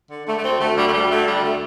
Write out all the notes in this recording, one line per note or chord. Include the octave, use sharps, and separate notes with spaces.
D3
D3 A3
A3
D2 C4
D2 A3
D3 G3
A3
D2 G3
D3 A3
D2 G3
D3 A3